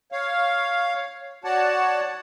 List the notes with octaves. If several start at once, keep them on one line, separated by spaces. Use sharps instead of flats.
C#5 F5
F#4 C#5 D5 F#5 A5